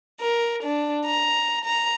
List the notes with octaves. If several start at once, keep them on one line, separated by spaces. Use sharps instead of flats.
A#4
D4
A#5
A#5